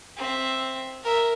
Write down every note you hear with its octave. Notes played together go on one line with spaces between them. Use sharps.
C4 E5
A#4 E5